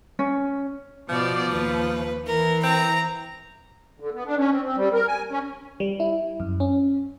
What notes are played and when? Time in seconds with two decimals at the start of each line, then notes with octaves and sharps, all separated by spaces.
0.19 C#4
1.09 B2 F3 D5
1.52 D#2 B4
2.27 E3 A#4
2.63 C4 A#5
4.00 D3
4.14 B3
4.26 D4
4.38 C#4
4.51 C4
4.63 C4
4.76 G3
4.94 A#4
5.08 G#5
5.30 C#4
5.80 G3
6.00 E4
6.40 F#2
6.60 C#4